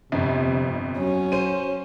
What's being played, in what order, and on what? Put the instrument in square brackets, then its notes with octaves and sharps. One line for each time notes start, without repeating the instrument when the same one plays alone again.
[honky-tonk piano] G1 F2 [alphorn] C3
[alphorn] F#3 [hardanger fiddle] C#4
[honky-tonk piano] C5 D#7